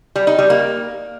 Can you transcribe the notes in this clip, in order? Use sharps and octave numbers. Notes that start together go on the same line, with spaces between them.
G3
D#4
G3
A#3